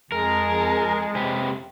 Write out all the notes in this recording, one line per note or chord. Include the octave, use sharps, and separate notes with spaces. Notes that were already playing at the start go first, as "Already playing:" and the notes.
F2 G#3 G#4 A#4 A5
C3 G4 B4